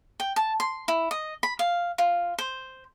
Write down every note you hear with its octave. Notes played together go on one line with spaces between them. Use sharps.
G5
A5
C6
E4
D#5
B5
F5
F4
C5